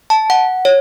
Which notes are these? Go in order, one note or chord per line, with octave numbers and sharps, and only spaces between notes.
A5
F#5
C#5